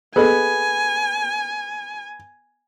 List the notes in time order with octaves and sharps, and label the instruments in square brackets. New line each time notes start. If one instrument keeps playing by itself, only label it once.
[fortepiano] B3 [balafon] G#4 A4 D#5 [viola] G#5